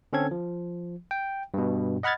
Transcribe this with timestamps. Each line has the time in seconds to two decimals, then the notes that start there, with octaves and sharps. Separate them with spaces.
0.13 D3 C4 C#4 A4 G#6
0.31 F3
1.11 G5
1.54 G2 B2
2.03 D#5 F#5 B5 F6 G#6 A6